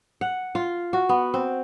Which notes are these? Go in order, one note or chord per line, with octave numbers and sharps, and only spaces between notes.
F#5
F4
F#4
B3
C4